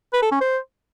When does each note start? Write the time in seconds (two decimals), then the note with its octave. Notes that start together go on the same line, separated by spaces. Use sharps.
0.13 B4
0.23 A4
0.32 C#4
0.41 C5